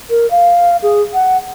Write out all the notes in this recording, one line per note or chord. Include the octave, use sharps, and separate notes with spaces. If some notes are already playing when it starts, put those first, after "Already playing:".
A#4
F5
G#4
F#5